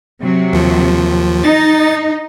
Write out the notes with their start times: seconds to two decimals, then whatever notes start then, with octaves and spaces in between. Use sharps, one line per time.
0.20 C3 F#3
0.53 D#2 F3
1.44 D#4 A6